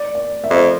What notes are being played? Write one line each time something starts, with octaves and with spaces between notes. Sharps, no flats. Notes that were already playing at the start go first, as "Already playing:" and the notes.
Already playing: D5
D5
E5
F2